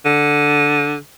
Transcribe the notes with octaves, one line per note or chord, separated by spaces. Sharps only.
D3